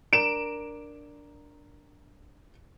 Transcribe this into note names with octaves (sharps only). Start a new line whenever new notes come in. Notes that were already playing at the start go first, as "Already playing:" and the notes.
D4 A#4 D7 E7